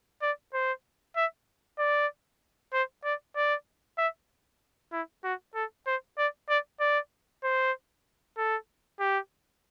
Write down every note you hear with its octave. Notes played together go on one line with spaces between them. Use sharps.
D5
C5
E5
D5
C5
D5
D5
E5
E4
F#4
A4
C5
D5
D5
D5
C5
A4
G4